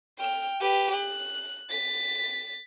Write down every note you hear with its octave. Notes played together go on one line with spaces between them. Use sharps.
G5 F6
G4 B4
F#6
A6 B6